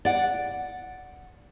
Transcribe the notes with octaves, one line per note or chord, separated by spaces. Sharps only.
D5 F#5